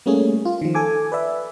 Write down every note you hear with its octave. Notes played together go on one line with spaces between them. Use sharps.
G3 A3 A#3 C#4 G#4
F4
D#3 F3
A4 G#5 D6
B4 D5 E5